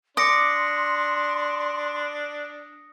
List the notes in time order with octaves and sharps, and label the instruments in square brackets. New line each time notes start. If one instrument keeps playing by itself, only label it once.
[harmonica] D4 [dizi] C6 [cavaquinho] D6 [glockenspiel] D#6 A#6 C#7